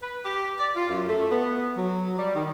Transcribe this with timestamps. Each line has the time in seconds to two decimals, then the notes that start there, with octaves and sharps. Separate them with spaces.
0.02 B4
0.25 G4
0.60 D5
0.76 F4
0.90 F#2
1.08 A3
1.31 B3
1.77 F#3
2.18 G3
2.35 D#3